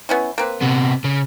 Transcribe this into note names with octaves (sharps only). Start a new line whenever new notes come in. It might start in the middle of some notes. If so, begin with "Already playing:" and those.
B3 C#4 E4
A#3 C4 B4
C3 B3
C#3